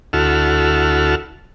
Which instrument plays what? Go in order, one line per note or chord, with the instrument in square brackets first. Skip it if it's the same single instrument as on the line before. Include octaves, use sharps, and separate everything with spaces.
[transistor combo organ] D2 E4 F#4 A4 F6